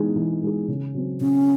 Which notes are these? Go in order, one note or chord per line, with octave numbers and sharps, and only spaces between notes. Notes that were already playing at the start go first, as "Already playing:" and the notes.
Already playing: E3 G#3 D#4 G#4
E3
G#3 D#4 G#4
C#3
F#3 C4
C#3 C#4